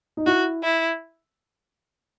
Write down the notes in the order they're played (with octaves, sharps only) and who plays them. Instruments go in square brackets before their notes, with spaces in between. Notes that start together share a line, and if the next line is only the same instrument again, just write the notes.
[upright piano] D#4
[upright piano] E4 [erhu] F#4
[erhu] E4